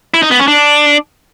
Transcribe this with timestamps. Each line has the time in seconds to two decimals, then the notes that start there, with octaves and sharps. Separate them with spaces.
0.14 E4
0.22 D#4
0.31 B3
0.39 C#4
0.48 D4